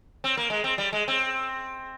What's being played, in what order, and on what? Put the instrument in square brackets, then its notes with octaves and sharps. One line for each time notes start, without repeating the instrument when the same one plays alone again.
[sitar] C4
A#3
G#3
C4
G3
G#3
C4